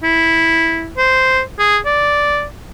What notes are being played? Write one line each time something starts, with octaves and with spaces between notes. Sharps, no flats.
E4
C5
G#4
D5